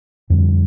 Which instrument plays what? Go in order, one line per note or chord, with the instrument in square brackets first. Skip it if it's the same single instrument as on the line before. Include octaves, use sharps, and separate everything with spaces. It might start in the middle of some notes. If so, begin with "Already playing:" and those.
[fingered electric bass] F2 D3 G3